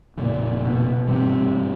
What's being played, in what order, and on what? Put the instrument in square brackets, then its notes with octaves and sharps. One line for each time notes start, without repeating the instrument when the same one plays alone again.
[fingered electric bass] F1 F2 C#3 F3 [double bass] A#2
[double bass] B2
[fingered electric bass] G#1 G2 E3 G3 [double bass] C3